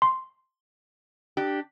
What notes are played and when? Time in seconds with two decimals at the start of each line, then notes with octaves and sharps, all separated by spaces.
0.02 C6
1.37 D4 G4